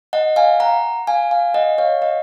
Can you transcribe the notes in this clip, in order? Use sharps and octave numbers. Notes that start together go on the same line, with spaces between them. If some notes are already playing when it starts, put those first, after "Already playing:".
D#5 F#5
F5 G#5
F#5 A#5
F5 G#5
F5 G#5
D#5 F#5
C#5 F5
D#5 F#5